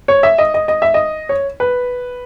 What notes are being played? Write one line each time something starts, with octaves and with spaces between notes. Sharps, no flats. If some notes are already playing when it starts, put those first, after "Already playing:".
C#5
E5
D#5
D#5
D#5
E5
D#5
C#5
B4